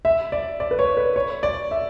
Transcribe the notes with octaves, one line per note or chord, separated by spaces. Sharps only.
E5
D5
D5
B4
C#5
B4
C#5
D5
E5